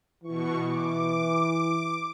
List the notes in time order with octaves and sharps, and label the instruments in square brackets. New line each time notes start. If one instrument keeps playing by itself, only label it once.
[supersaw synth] B2 C#6 [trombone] E3
[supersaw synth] D6